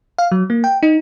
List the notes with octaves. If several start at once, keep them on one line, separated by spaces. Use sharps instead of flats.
F5
F#3
A#3
G5
D#4